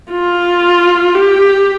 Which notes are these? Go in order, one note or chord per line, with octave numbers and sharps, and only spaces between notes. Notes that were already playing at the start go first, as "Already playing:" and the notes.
F4
G4